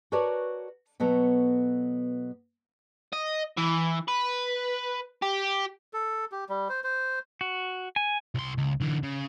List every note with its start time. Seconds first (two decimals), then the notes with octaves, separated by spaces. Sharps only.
0.12 F#4 A#4 B4 C#5 D5 A5
1.00 B2 F#3 B3 A4 C#5
3.13 D#5
3.57 E3
4.08 B4
5.22 G4
5.93 A4
6.32 G4
6.49 G3
6.69 C5
6.84 C5
7.41 F#4
7.96 G#5
8.35 C2 C6
8.58 C#2
8.81 D3 E3
9.03 C#3